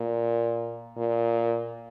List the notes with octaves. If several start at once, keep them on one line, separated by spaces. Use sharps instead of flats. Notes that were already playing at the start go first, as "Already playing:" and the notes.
Already playing: A#2
A#2